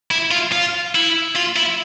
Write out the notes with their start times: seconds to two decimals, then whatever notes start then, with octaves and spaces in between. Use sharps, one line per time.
0.11 E4
0.31 F4
0.52 F4
0.95 E4
1.36 F4
1.57 E4